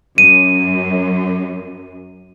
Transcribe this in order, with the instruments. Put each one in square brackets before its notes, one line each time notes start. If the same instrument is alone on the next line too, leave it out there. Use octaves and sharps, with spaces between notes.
[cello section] F#2 [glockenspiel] D#7